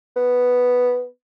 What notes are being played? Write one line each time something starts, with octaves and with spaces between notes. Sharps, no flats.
B3